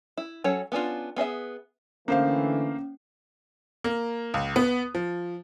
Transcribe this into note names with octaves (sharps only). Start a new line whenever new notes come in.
E4
F#3 C#4 A4 C#5
B3 C#4 D4 F4
B3 G#4 D#5 E5
D3 E3 A3 A#3 C#4 C5 F5
A#3
C#2
B3
F3